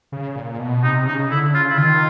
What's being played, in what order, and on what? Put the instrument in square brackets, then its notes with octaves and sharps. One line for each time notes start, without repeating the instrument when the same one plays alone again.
[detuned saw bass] C#3
A#2
B2
[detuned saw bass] C3 [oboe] D#4
[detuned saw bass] C#3 [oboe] D#4
[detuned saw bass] D3 [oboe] E4
[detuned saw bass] C#3 [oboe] F4
[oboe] E4
[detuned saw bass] D#3 [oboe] F4